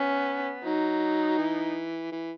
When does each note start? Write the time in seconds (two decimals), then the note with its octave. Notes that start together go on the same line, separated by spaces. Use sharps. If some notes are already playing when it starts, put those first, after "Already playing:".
Already playing: B3 C#4
0.64 F#3 D#4
1.38 E3
2.12 E3